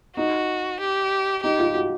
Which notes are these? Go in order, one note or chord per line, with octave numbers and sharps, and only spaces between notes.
D#4 F#4
G4
D#4 G4
F4
F#4